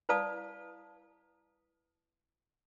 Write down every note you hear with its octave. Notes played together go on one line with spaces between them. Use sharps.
E4 B4 D5 F5 A5 D#6